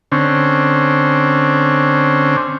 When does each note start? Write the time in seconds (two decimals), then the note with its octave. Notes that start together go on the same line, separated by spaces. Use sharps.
0.12 D3 C4 C#4